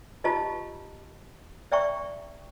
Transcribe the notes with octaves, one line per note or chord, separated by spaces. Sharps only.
D#4 F4 G4 D#5 A5 A#5
D5 E5 G5 A#5 C#6